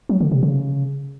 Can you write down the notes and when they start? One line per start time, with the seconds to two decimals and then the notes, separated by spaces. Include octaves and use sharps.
0.09 F#3
0.21 D3
0.32 C3
0.43 C#3